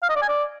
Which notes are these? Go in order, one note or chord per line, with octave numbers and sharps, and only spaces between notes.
F5
D#5
D5
G#5
D5